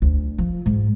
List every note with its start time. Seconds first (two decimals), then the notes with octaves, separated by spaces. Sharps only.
0.02 D2
0.38 F3
0.66 G#2